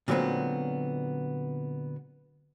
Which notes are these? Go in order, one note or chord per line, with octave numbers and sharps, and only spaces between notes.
A#2 D3 F#3 G#3 B3 C4